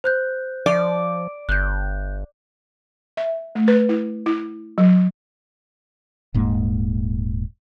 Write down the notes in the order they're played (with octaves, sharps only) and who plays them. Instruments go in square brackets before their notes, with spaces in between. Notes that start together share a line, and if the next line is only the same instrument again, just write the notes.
[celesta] C5 F#6 G6
[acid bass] F3 [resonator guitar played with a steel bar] D5
[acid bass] G1 [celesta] F#6 G6
[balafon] E5
A3
B4
E4
E4
F#3
[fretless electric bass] D#1 G#2 G#3 A#3